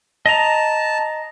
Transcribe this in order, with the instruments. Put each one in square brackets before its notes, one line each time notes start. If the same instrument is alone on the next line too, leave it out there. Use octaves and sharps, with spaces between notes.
[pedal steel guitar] D#5 A#5 [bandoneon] A5